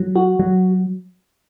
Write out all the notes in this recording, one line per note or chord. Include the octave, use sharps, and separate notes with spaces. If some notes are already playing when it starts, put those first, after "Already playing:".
Already playing: F#3
F#4
F#3